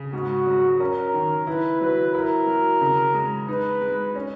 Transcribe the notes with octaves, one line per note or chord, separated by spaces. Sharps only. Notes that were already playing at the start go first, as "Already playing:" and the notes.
Already playing: C#3
G#2 F#4
F#3
C#4 A#4
D#3
E4 B4
F#3 B4
E4 A#4
F#3
C#3
G#3
D#4 B4
G#3
C#4